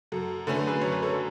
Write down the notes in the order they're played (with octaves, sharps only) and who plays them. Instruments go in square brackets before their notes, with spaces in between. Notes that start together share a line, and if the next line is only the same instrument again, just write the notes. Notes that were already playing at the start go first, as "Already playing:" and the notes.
[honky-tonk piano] F#2 [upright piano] F#4 A4
[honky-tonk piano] D3 A3 C#4 F#4 [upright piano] B4
[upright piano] A4
G#4 B4
[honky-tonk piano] F#2 [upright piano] C#5
[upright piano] B4
A4 C#5